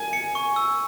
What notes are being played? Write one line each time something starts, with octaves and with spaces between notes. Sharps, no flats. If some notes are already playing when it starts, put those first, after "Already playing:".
Already playing: G#5
C#7
C#6
E6